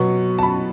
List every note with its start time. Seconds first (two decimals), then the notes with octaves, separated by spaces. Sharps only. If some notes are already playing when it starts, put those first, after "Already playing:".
Already playing: B2 F#3 B3 C#6
0.39 A5
0.43 B5